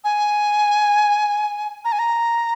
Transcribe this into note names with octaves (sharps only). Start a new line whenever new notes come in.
G#5
A#5
G#5
A#5